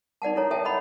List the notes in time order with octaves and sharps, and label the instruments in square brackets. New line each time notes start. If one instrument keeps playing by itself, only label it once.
[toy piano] D#4 D5 F#5 A5
E4 A4 C#5 A#5
A4 E5 G5 A5
C#5 D#5 F#5 B5